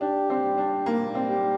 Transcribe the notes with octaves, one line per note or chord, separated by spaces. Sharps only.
D4 G4
C4
G3
D4
G3 A#3
C4
G4